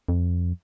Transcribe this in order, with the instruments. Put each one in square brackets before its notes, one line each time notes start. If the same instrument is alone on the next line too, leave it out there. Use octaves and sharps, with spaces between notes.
[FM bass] F2